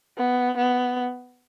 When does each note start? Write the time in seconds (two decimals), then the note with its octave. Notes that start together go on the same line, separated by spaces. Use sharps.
0.18 B3
0.57 B3